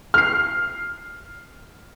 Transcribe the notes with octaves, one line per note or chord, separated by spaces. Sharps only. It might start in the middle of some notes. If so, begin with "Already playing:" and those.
F6 C7